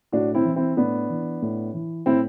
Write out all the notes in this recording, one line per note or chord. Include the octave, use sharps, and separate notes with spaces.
A2 D4 F#4
C4 E4
E3
C4 E4
A2 B3 D4
E3
A2
E3
A2 C4 E4